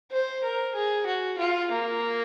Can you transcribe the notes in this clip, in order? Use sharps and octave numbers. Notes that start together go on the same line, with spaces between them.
C5
A#4
G#4
F#4
F4
A#3